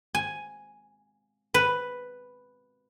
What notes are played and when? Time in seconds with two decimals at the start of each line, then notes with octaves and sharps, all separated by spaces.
0.15 G#5
1.54 B4